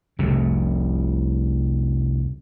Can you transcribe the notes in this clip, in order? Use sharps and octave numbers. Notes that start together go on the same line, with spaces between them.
F1 C2 F2 C3